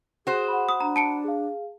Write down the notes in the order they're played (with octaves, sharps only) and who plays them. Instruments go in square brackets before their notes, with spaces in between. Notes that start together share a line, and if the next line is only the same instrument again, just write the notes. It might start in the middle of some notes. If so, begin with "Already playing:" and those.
[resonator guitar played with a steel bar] F#4 C5 [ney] G#4
[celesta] F#5 B5
[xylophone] D#6
[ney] D4 [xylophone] A#5
[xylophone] A5 C#7 D7
[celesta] G#4 F5